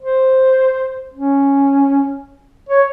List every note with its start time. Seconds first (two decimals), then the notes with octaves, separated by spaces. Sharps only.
0.01 C5
1.14 C#4
2.69 C#5